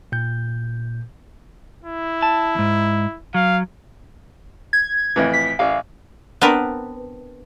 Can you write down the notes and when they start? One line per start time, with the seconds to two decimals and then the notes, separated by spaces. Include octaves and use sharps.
0.12 A#2 G6
1.84 E4
2.22 A5
2.55 E2 G#2
3.34 F#3 F5
4.73 G#6
5.16 F2 A2 E3
5.33 B6
5.59 A1 F5
6.41 B3 C4 D4 A#4 B4